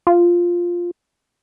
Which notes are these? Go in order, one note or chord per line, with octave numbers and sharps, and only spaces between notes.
F4